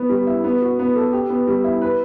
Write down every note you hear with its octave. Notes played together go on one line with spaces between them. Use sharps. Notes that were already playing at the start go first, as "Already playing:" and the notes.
Already playing: B3
G3
E4
B3
F#4
B3
A4
G4
B3
G3
E4
B4